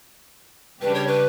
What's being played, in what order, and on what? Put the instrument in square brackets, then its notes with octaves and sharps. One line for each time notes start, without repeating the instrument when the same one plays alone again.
[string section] C#3 G3 D4 G4 [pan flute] B4
[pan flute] C#5
B4